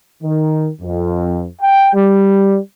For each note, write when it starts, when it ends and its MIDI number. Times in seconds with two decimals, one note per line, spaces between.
0.23 0.68 51
0.81 1.44 41
1.61 1.92 79
1.94 2.58 55